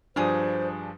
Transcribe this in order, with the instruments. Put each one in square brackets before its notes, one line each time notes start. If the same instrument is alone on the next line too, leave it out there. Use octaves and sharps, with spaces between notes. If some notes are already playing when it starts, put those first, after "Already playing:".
[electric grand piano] G2 F3 D4 [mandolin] G#4 D#6 F6 [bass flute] C5